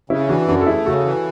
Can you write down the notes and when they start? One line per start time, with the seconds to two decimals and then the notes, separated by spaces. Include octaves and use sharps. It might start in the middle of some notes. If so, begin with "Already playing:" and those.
0.10 C#3 C#4 E4
0.29 E3 D4 F#4
0.48 F#2 D4 F#4
0.61 A4
0.67 A3 E4 G#4
0.86 C#3 F#4 A4
1.05 E3